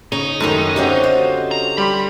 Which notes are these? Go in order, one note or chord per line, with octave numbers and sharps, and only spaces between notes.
C#3 D#4 C#5
F#2 D#3 G#3 A3 E4 G4
D3 A3 C4 C#4 F#4 G4
F4 C5 D#5
A#5
G3 G4 B5 C6